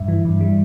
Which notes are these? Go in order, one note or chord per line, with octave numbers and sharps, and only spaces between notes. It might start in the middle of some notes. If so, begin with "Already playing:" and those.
Already playing: G2 E5
E3
G2
G3